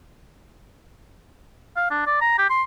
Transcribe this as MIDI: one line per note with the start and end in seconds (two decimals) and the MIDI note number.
1.76 1.86 77
1.91 2.04 62
2.06 2.21 74
2.21 2.38 82
2.38 2.48 67
2.50 2.63 84